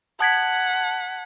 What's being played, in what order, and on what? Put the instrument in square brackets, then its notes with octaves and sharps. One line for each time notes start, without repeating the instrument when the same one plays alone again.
[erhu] F#5 [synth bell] A5 G#6 B6